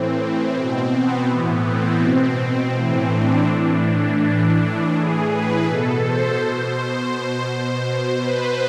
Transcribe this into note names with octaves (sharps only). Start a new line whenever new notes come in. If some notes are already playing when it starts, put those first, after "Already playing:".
Already playing: A2 E3 C4
B2
B3
A2 E3
C4
B2 C4
A2 E3 C4
D4
A2 E3 D4
A2 E3 D4
A2 E3 G#4
B4
B2 A4
C5
B2
C5
B2
C5
B2
B4